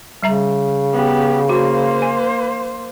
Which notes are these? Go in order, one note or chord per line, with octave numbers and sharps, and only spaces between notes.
C#3 G3 E5 A#5
B3 G4
A#3 F#4 C5
G#5